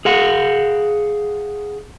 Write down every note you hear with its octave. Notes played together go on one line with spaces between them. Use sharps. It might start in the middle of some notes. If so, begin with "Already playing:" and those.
G#4 F5 F#5